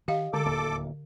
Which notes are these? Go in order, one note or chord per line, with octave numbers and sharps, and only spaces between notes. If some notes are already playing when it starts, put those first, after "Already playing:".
D#3 G4 D#5 F5
D3 G#3 A4 D6
D1 D#2 A#3